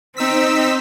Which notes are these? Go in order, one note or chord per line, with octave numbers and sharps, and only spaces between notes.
C4 D#4 E6 B6